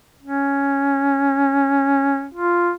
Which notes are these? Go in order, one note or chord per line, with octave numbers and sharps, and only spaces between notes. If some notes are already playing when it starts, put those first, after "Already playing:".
C#4
F4